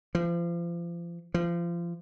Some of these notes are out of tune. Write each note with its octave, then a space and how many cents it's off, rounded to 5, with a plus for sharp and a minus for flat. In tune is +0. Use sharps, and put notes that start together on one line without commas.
F3 -35
F3 -30